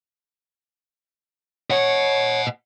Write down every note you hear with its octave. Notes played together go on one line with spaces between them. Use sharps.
C#5 D#5 F#5